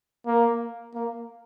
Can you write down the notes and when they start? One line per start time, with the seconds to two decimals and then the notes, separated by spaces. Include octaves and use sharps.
0.27 A#3
0.94 A#3